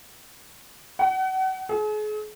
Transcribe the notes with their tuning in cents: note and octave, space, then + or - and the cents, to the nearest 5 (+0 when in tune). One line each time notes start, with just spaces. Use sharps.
F#5 +35
G#4 +40